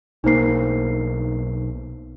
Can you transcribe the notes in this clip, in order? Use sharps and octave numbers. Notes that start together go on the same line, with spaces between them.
B1 A#3 D#4 C5 C7